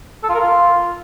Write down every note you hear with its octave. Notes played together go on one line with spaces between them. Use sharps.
A4
F4
A#4
F4